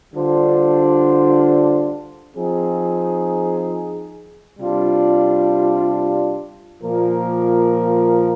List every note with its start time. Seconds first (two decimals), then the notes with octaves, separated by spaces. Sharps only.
0.13 D3 G3 D4 F4 C5
2.36 F3 C4 D#4 G#4
4.59 C3 G3 D4 F4
6.81 A#2 F3 A#3 F4 A#4